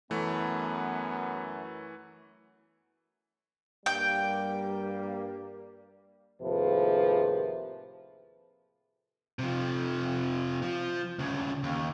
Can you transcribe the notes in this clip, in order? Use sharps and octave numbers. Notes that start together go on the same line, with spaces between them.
F#2 E3 A3 B3
G2 G3 A#3 G5
D#2 A2 C3 F3 G#4 B4
C3 F3
F3
D2 C#3
D#2